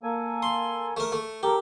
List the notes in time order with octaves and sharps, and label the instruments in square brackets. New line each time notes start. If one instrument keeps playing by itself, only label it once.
[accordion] A#3 A4 G#5
[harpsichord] C6
A3 A#4
A3
[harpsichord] G4 [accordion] A4 A#4